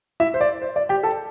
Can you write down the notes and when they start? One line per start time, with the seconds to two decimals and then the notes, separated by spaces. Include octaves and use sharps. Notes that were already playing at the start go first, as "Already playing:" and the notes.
0.20 E4 E5
0.34 C5
0.41 D5
0.62 C5
0.76 D5
0.89 G4 G5
1.03 A4 A5